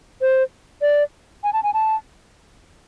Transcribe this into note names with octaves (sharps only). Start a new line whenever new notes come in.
C5
D5
G#5
A5
G#5
A5